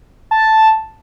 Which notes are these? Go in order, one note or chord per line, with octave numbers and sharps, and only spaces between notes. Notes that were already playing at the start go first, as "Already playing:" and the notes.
A5